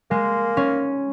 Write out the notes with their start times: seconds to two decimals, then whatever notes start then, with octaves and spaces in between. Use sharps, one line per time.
0.11 G#3 A#3
0.57 C#4